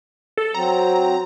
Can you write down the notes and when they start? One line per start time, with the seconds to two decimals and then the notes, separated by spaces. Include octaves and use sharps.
0.37 A4
0.54 F#3 C4 A#5